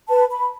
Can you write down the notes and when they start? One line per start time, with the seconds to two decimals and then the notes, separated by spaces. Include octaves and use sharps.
0.08 B4 A5
0.31 B5